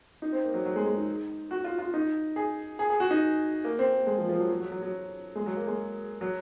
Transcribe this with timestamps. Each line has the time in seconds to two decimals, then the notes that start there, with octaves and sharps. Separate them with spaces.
0.22 D#4
0.33 C4
0.44 A#3
0.54 F#3
0.65 F#3
0.76 G#3
0.86 G#3
0.97 D#4
1.51 F#4
1.64 F4
1.79 F4
1.94 D#4
2.36 G#4
2.79 G#4
2.90 G#4
3.00 F#4
3.11 D#4
3.65 A#3
3.79 C4
3.92 A#3
4.07 G#3
4.18 F3
4.29 F3
4.39 F#3
4.50 F#3
4.60 F#3
4.72 F#3
4.83 F#3
5.35 G#3
5.46 F#3
5.57 A#3
5.67 G#3
6.21 F#3